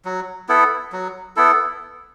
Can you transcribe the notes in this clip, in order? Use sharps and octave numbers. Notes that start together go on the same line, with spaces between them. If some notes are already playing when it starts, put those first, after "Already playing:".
F#3
B3 E4 A4
F#3
B3 E4 A4